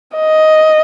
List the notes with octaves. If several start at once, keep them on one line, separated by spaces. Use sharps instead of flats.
D#5